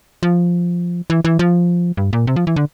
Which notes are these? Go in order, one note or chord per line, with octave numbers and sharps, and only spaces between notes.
F3
E3
E3
F3
G2
A#2
C3
F3
E3
D3